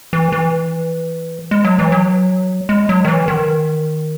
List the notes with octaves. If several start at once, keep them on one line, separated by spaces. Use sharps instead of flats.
E3
E3
G#3
F#3
E3
F#3
G#3
F#3
D#3
E3
D#3